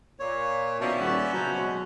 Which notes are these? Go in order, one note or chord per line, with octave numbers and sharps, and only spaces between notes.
A#2 C#5
B2 D#3 F3 C#4 D5 E5 A5
D#1 B3 C#4 F#4
C#3 F#3 C5 A#5
B2 G#3